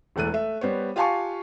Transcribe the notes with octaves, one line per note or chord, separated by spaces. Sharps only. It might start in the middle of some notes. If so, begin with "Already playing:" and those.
E1 E2 A3 F#6 D#7
A3 E5
G3 B3 C5 C#5
F4 G4 F5 G#5 A5 C#6